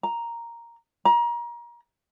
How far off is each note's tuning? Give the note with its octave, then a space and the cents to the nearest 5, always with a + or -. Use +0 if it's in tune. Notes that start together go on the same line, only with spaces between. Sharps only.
A#5 +0
A#5 +30